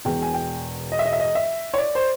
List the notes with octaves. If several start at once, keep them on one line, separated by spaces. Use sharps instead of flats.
E1 E2 B2 G5
G#5
G5
D#5
E5
D#5
E5
D#5
E5
C#5
D5
C5